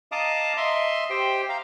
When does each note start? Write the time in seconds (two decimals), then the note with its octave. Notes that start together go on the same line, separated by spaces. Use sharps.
0.12 D#5 F5 A5 A#5 D6 D#6
0.57 D#5 E5 C6
1.10 G4 C5 G5
1.49 F5 A#5